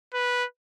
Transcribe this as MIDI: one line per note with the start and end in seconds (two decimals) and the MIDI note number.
0.14 0.45 71